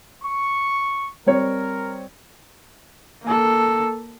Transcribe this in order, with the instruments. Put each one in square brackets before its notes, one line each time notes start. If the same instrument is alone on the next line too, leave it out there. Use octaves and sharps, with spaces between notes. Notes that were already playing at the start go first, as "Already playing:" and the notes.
[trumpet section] C#6
[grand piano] G3 C4 C#5 [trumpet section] A#4
[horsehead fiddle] A#3 A4